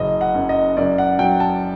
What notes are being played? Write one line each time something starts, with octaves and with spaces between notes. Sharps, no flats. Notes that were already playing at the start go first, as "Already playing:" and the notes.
Already playing: F#1 D#5
F#5
F#2
D#5
F#2 D5
F#5
F#3 G5
A5